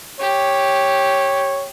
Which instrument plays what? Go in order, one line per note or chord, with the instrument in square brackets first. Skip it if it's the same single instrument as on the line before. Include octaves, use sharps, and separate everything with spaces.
[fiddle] G4 [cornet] C#5